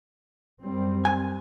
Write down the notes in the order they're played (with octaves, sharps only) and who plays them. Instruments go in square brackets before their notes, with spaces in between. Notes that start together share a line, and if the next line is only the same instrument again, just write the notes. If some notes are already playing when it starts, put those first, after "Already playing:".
[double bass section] F#2 G3 C4
[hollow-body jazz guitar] G#5